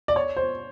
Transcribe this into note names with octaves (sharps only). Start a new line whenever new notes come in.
D5
C#5
C5